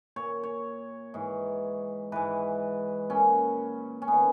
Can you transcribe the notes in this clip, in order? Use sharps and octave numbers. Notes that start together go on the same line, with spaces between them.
A#2 C#5
C#5
G#2 E3
G#2 E3 B4
A#2 C#4
C#4
D#3 B3